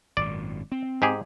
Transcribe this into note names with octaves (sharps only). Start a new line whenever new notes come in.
G#1 F#2 A#2 D5
C4
G#2 G4 G#4